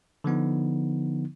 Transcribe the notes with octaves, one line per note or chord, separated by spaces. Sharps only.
D3 F3 B3 D#4